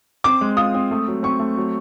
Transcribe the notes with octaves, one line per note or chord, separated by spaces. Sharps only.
C4 D6
G#3
F4 D#6
C4
A3
F#3
C4 C#6
A3
F#3